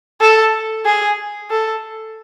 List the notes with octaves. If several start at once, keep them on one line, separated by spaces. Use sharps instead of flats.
A4
G#4
A4